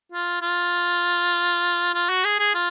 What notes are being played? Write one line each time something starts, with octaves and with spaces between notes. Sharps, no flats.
F4
F4
F4
F#4
G#4
G#4
F4